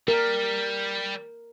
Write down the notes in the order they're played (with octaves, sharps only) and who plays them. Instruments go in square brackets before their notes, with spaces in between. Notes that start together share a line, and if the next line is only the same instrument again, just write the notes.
[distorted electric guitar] G3 [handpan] A#4